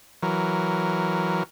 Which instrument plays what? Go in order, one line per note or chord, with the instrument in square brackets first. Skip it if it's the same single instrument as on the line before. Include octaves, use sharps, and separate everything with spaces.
[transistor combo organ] E3 F#3 A#4